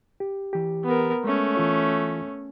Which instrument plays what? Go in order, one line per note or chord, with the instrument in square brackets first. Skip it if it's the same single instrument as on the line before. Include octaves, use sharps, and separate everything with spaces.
[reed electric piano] G4
E3 G4
[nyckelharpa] B3 A#4
[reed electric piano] G#3 [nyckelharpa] A3 C#4
[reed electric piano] E3 F4 C#5